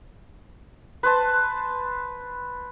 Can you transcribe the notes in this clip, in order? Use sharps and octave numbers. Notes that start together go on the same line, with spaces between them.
B4 C5 A5